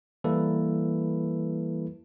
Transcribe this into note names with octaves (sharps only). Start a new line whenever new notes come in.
E3 G3 A#3 E4 A4 B4